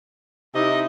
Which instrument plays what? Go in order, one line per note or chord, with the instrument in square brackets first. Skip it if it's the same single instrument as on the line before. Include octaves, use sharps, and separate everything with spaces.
[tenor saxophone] C3 [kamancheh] D#4 E4 [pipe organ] D#5